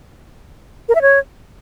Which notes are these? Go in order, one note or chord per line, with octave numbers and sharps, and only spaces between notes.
A#4
E5
C#5